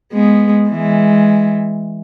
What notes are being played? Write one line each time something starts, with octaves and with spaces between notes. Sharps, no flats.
G#3 B3
E3 G#3